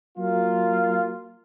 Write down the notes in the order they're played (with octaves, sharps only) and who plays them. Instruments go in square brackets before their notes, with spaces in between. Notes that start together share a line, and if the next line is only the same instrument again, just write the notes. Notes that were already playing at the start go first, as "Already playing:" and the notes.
[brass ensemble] F#3 A#3 F4